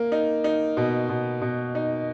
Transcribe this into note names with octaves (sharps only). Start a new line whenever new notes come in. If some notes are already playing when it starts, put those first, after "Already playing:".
Already playing: A#3
D#4
D#4
B2
B2
B2
D#4